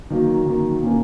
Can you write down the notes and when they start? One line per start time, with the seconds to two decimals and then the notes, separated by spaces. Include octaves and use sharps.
0.10 D#3 F#3 A#3
0.46 D#3 F#3 A#3
0.82 A#2 A#3 C#4